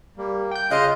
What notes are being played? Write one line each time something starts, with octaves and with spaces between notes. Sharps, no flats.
G3 A#3
G5 G6
C#3 F4 D#5 F5 C6 F#6